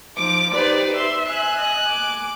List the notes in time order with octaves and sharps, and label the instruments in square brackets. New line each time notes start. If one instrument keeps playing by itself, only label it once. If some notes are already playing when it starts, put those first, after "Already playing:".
[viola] F3 D#4 [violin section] D6
[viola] D#4 G4 [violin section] B4 C5 D5
[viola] E5 [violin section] C6
[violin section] G#5 F#6
[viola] D#5
D6